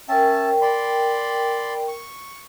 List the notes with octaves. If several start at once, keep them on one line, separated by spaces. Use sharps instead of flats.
C#4 A#4 E5 G5 A5
D5 B5 C6
C#6